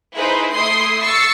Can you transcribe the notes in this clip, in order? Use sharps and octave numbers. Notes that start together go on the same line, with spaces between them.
D#4 E4 G#4 B4 C5
A3 E4 C6 D#6 C7
C#6 E6 A6 C7 C#7